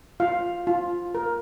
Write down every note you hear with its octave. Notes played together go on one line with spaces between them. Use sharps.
F4 F5
F4
A#4